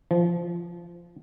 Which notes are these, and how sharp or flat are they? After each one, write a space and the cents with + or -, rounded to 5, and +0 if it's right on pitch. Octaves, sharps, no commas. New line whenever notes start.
F3 -15